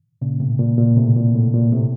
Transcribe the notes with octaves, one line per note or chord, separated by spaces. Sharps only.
A#2 C#3
A2 C3
A#2
A#2
A2 C3
A#2
A2
A#2
A2 C3